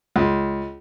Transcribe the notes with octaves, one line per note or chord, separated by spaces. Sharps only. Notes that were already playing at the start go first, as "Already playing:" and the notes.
C#2